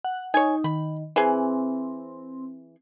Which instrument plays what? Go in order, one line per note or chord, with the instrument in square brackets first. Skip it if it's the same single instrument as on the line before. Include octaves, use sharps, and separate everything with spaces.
[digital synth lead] F#5
[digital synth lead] D#4 [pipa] C#5 G#5
[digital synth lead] D#3 [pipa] B5
[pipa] E3 G#4 [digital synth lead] C4